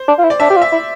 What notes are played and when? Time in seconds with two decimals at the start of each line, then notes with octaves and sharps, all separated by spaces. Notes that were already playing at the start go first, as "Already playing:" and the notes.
Already playing: C5
0.08 D4
0.18 F4
0.24 E4
0.30 D5
0.40 D4 E5
0.50 G4
0.56 F4
0.62 E5
0.72 E4